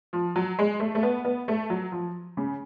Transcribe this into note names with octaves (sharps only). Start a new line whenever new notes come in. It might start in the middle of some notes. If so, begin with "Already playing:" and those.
F3
F#3
G#3
A3
A3
B3
B3
A3
F#3
F3
C#3